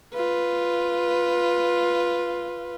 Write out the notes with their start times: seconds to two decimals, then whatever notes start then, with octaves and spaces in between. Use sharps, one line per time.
0.14 F4 B4